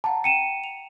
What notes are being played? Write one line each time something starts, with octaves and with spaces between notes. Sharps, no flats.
F5 F#5 A5 A#5
G5 C#7 D#7 E7
F7